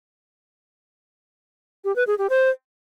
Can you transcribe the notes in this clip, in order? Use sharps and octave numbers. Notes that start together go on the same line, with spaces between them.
G4
B4
G#4
G4
C5